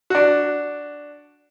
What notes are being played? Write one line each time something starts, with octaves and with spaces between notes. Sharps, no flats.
D4 F#4